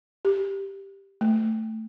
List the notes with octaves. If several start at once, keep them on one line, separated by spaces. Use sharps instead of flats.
G4
A3